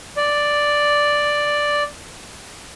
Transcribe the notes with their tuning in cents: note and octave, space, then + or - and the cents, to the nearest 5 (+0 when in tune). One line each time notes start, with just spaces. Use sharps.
D5 +0